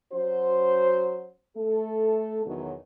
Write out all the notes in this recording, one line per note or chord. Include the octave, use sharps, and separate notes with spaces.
F#3 C#4 F#4 C5
A3 A4
E2 B2 D#3 F#3